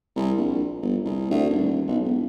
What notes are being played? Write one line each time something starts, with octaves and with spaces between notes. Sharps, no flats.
C2
A#1
G1
C2
D2
D#1
B1
E1